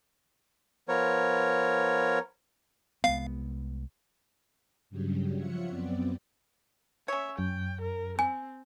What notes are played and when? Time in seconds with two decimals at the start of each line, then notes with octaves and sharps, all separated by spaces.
0.89 F3 B3 A#4 C#5
3.04 C2 G#3 B3 F5
4.90 G2 C#3 F#3 G3
5.37 F3 F4 C#5 E5 F#5 C#7
5.68 F#2 B3 C4 D5
7.08 C#4 C#5 E5
7.39 F#2 G5
7.82 A#4
8.19 C4 G#5